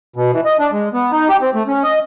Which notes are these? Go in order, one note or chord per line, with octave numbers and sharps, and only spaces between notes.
B2
E3
D#5
D4
G#3
B3
D#4
G4
C4
A3
C#4
D#5